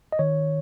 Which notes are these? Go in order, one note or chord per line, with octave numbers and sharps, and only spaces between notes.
D#5
D#3 C#5